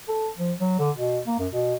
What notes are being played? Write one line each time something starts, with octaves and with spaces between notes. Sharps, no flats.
A4
F3
F#3
D3
B2
A#3
F#2
B2